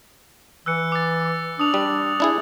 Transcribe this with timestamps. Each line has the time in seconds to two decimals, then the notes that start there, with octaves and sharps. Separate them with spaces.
0.66 E3 E6 F#6 C#7
0.92 D6 A6
1.60 D4 D#6 F7
1.74 G3
2.20 D4 E4 G#4